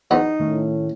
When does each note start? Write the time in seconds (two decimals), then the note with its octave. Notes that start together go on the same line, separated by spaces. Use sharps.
0.11 E2 B3 D#4
0.40 A2 D#3 A3 C#4